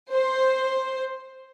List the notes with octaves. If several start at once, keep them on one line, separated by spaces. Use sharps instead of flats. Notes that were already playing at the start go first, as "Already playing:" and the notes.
C5